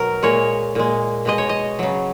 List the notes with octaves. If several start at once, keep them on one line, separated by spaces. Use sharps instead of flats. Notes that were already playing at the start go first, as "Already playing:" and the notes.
Already playing: B2 F#3 A#4
A#2 G#3 C#5
A#2 G#3
B2 G#3 D#5
C#5
D#5
C#3 F#3